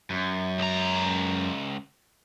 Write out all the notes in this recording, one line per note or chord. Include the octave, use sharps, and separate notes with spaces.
F#2
C#2 A#5